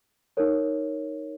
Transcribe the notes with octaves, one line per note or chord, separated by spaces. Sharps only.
D#4 A#4 C#5